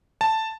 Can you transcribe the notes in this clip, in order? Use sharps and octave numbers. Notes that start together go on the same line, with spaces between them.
A5